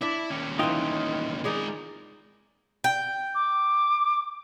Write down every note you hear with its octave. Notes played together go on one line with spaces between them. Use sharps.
D4 E4 D5 E5
D#2 C#4
E3 F3 D#4 F4 G5
G#3 D#4 G#4 A#4 D5
G5
D6